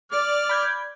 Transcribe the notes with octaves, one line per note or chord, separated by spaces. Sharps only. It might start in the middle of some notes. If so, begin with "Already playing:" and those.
D5 D6 F6
B5 G6 G#6